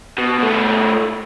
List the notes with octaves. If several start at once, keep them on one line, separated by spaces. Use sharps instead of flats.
B2
B2 A3